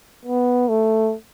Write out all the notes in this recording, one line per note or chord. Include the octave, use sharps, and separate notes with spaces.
B3
A3